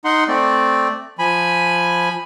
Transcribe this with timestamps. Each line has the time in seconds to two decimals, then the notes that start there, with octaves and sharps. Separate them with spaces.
0.05 D#4 F#5 C6
0.28 A3 C4 D5
1.19 F3 G#5 B5